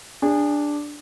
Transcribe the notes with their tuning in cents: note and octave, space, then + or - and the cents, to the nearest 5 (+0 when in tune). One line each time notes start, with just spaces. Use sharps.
D4 +0 G#4 -30